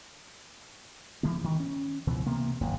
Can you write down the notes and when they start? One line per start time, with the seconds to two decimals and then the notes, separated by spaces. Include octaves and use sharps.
1.23 E3 F3 G#3 B3
1.42 G2 D#3
1.60 C#4
2.07 C#2 B2 E3 F3
2.26 C3 A#3 B3
2.61 F#1 D#2 G#2 C#3